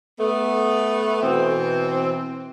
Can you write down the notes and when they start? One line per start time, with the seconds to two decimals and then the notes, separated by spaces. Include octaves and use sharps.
0.20 A3 B3
1.23 B2 E3 C4